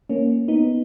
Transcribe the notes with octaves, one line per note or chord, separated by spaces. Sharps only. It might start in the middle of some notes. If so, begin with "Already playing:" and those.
A#3 C#4
B3 D#4